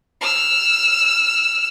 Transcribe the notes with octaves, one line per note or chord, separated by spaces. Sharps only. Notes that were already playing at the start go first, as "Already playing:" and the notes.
E6 F6